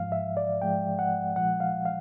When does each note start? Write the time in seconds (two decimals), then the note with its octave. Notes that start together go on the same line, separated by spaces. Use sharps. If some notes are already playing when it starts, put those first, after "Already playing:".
Already playing: G#2 F3 G#3 F5
0.12 E5
0.37 D5
0.62 G#2 F3 G#3 G5
0.99 F#5
1.36 A#2 F3 G#3 F#5
1.60 F5
1.85 F5